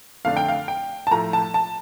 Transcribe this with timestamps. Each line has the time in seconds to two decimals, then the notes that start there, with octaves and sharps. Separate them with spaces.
0.25 F2 D3 A3 D4 F5
0.37 G5
0.48 F5
0.68 G5
1.07 A5
1.11 A2 F3 A3 A#5
1.33 A5
1.54 A5